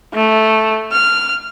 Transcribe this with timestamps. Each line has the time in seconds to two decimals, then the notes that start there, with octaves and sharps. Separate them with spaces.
0.14 A3
0.92 F6